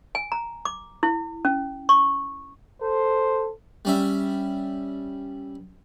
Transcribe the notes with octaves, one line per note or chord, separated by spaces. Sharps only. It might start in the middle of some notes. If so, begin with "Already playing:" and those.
G#5
A#5
D6
E4
C#4
C#6
A4 C5
G3 C#4 E5